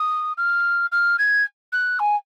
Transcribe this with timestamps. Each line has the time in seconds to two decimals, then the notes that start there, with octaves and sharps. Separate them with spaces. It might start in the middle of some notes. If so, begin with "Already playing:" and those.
Already playing: D#6
0.38 F6
0.92 F6
1.19 G#6
1.72 F#6
1.99 G#5